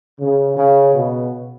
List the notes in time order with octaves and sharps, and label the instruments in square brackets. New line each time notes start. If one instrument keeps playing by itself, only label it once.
[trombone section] C#3
C#3
B2